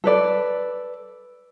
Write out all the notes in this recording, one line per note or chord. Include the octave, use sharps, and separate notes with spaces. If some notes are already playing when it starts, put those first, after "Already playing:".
A4 B4 D5